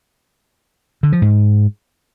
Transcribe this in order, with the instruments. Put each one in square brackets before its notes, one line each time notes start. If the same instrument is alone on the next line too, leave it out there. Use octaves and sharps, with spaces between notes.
[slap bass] D3
F3
G#2